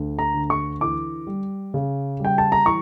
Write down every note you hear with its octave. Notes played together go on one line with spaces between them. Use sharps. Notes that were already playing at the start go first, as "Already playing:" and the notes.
Already playing: D2
A#5
D3
C#6
E3 D6
G3
C#3
G3 G5
A5
A#5
E3 C#6